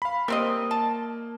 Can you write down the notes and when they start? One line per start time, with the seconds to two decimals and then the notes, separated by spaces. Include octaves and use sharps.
0.02 F5 B5
0.28 G3 A#3 C4 D#5
0.71 A5